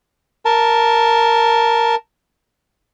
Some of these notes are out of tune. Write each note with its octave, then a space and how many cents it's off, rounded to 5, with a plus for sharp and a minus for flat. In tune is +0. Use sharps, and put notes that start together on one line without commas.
A#4 +0 A5 +0